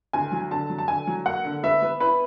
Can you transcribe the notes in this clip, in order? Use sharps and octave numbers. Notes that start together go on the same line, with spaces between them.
D2 G#5
F#3
D3 A5
F#3
A5
D3 G#5
F#3
A#3 F#5
D3
B3 E5
B3
E4 B4